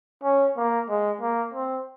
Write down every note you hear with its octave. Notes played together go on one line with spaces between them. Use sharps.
C#4
A#3
G#3
A#3
C4